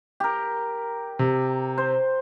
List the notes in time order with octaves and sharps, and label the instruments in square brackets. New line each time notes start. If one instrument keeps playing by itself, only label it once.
[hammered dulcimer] G4 A#4
[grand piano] C3
[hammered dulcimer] C5